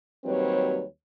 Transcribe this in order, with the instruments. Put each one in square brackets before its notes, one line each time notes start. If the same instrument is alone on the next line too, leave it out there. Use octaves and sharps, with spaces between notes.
[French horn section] D#2 F#3 G3 C4 B4 C#5